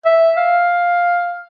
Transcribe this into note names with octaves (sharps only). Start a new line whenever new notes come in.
E5
F5